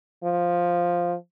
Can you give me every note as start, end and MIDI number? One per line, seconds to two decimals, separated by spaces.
0.23 1.15 53